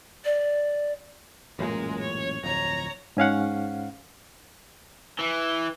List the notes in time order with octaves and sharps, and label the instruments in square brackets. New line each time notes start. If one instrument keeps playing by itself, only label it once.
[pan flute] D5
[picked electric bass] A1 F#2 A#2 [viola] G#3 A#4
[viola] C#5
[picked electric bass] D1 F2 [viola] C#5 A#5
[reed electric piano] G#2 C#4 F5 F#5
[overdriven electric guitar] E3